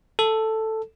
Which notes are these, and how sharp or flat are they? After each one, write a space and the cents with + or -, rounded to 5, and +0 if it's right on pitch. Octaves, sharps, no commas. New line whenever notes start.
A4 +5